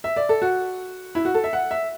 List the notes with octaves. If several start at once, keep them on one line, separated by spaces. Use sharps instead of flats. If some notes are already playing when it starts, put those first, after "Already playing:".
E5
D5
A4
F#4
E4
F#4
A4
E5
F#5
E5